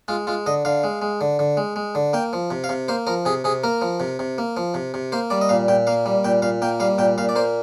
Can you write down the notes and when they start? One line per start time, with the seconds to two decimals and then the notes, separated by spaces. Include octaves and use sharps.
0.08 G#3 F4
0.27 G#3 F4
0.46 D3 D#5
0.65 D3 F5
0.84 G#3
1.02 G#3
1.21 D3
1.39 D3
1.57 G#3
1.76 G#3
1.95 D3
2.13 A#3 G5
2.33 F3
2.51 C3
2.64 F5
2.69 C3
2.88 A#3 C5
3.07 F3 A#4
3.25 C3 G#4
3.44 C3 G#4
3.64 A#3 A#4
3.82 F3
4.00 C3
4.19 C3
4.38 A#3
4.57 F3
4.74 C3
4.94 C3
5.12 A#3 C5
5.30 G3 D5
5.41 D#5
5.49 A#2 F5
5.68 A#2 G5
5.87 A#3 F5
6.06 G3
6.24 A#2 G5
6.42 A#2 F5
6.62 A#3 G5
6.80 G3 F5
6.98 A#2 G5
7.18 A#2 F5
7.29 D5
7.36 A#3 C5